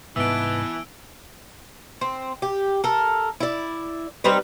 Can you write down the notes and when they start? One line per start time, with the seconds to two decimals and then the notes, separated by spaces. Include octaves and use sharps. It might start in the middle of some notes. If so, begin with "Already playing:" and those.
0.16 C2 G#2 E3 B3 D#4 A5 E6 D7
2.01 C4
2.42 G4
2.84 A4 A#4
3.40 E4 D5
4.24 G3 C4 D#4 B4